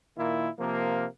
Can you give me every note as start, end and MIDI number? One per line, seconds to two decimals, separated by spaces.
0.17 0.49 46
0.17 0.49 51
0.17 0.49 58
0.17 0.49 64
0.59 1.06 48
0.59 1.06 53
0.59 1.06 58